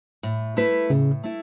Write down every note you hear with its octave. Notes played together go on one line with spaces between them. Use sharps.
A2
A3 E4 B4
A2 C#3
A3 E4